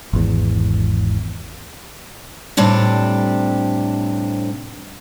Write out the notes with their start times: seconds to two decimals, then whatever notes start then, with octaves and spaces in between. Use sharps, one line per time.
0.13 G#1 E2
2.57 A2 C3 G3 D4 G4